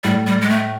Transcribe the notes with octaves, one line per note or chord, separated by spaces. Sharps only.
A2 G3
G3
G#3
A3